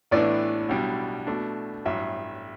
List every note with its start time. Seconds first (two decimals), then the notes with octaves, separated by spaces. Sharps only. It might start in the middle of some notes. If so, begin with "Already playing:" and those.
0.11 A1 A2 E3 B3 D4 D5
0.69 B1 B2 G3 D4
1.27 B2 A3 D4
1.85 A1 G2 F#3 E5